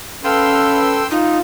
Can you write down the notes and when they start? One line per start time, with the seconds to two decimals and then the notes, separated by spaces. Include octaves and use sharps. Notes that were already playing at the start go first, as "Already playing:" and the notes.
0.24 C#4 A4 B4 F5 G5 C6 E6
1.11 D#4 F4